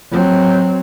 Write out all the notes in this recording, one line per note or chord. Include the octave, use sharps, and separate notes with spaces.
F#3 C4